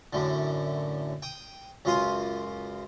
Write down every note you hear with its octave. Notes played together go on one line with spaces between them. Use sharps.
F#2 A2 D3
G5 D#6
C#2 F#2 F4 F5 C6 D#6